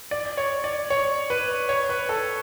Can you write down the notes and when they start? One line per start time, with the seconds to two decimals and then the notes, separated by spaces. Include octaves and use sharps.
0.11 D5
0.37 C#5
0.64 D5
0.90 C#5
1.30 B4
1.69 C#5
1.89 B4
2.09 A4